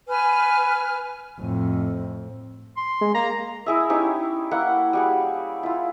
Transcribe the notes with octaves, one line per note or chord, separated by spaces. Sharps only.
B4 G#5 F6
F2 A2
C6
G#3
A#3 A#5
E4 G#4 E5
C#4 D#4 E4 G4
A#3 E4 F#5
G3 F#4 G#4
E4 F4